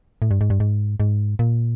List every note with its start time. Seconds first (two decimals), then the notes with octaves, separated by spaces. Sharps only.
0.22 A2
0.31 G2
0.41 G#2
0.50 G2
0.60 G#2
1.00 G#2
1.39 A#2